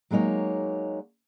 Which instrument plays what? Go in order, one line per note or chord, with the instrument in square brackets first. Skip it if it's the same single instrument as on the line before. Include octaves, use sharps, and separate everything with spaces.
[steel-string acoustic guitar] F#3 G#3 A#3 D#4 C#5